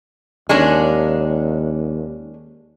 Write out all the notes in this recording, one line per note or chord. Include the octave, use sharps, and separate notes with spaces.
D#2 G#3 C#4 D4